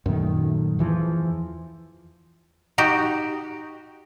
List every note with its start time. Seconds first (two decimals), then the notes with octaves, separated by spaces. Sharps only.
0.06 F#2 A#2 D#3 A3
0.79 E2 E3 F3
2.78 D#4 F#4 G4